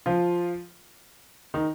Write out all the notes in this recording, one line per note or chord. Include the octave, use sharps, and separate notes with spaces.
F3 F4
D#3 D#4